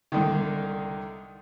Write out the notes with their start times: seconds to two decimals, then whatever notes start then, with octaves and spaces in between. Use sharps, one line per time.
0.12 C2 D3 D#3